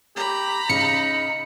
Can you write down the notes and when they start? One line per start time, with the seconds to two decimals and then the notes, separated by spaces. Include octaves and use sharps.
0.16 G4 A#5 B5
0.69 C#3 D#4 C#7